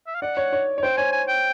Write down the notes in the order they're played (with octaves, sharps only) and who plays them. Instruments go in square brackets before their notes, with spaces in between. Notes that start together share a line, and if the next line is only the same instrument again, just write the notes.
[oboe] E5
F5
[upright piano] D5 [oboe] F#5
[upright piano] C#5
C#5
C#5
[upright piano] C5 [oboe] G5
[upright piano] C#5 [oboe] G#5
[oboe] G#5
G5